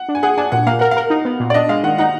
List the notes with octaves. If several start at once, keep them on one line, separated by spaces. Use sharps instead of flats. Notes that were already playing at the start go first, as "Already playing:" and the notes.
Already playing: F#5
D4
G#5
G#4 F#5
D4 G#5
A#2 F#5
A#3 F5
A#4 F#5
F5
A#4
D#4
B3
A#2
D5
D4 D#5
G#3 F5
D#3 F#5
D#4 F#5